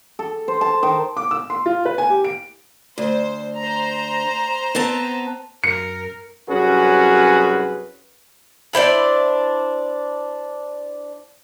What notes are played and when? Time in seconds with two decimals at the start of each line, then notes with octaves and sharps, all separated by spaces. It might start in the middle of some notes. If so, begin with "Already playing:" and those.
0.19 A4
0.48 C5
0.61 A5
0.83 D#3
1.17 D6
1.31 E6
1.50 C6
1.66 F4
1.86 B4
1.98 G#5
2.10 G4
2.25 D7
2.98 D2 C5
3.57 C5 A#5
4.75 B3 C4 A5
5.64 F#2 A#4 C#7
6.49 C2 F#2 C#4 F#4 G#4 B4
8.73 D4 E4 C5 D5